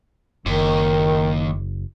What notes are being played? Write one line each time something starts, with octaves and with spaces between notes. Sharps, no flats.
F#1 D#2 D#3